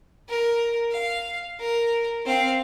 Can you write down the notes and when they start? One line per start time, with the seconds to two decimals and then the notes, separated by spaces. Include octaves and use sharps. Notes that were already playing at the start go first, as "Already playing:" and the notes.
0.29 A#4
0.91 F5
1.59 A#4
2.25 C4 F5